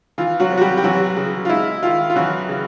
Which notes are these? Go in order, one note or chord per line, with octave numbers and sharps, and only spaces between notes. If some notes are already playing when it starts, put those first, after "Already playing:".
E3 F4
F#3 F#4
C3
F#4
G3 G4
G4
E3 F#3 F#4
C#3
F4
G#3 E4
D#3 F4
F4
E3 F#3 F#4
C#3